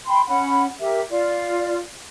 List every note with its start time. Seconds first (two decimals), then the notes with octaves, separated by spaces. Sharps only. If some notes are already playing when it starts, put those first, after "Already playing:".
0.07 G5 B5 C6
0.28 C#4 F#5 B5
0.79 G4 A#4 E5
1.10 F4 D5